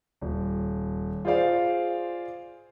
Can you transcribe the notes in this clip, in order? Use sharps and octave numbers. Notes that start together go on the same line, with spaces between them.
D#1
F4 G#4 C5 D5 F5